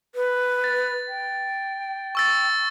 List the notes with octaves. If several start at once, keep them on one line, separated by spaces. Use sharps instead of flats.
B4
A6
G5
C#6 E6 A6